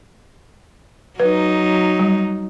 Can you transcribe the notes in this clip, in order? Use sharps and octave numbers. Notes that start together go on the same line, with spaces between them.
F#3 D#4 B4
G3